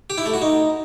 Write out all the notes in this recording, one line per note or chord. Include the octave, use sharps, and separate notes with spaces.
G4
E4
A3
F#4
D#4